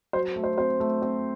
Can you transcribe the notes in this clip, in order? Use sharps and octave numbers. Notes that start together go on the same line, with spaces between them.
F#3 C5
A3
C5
C4 C5
A3
C4